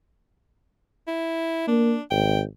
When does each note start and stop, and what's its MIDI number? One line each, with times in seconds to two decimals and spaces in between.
1.08 1.67 64
1.68 1.96 58
1.68 2.02 62
2.11 2.43 32
2.11 2.40 79